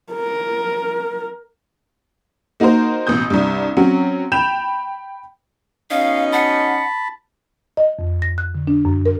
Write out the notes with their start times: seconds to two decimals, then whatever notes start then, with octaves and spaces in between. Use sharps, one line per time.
0.13 A#4
2.60 A#3 D#4 F#4 A#4 C5
3.07 A1 B2 D#6 G6
3.30 C2 G2
3.77 F#3 C4 C#4 F#4
4.32 G5 B5 G6 E7 F7
5.91 B2 C#4 D#4 F5
6.32 F#5 A5 B5
7.77 D#5
7.99 F2
8.22 A#6
8.38 F#6
8.55 D3
8.67 D4
8.85 F#2
9.06 A#4